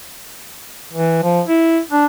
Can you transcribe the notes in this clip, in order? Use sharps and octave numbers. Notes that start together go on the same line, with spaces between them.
E3
F3
E4
D4